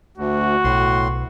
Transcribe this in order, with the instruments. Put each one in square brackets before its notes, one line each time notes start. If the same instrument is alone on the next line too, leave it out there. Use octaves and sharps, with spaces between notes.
[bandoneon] D2 [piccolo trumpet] F#4
[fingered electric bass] B1 [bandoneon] A2 C6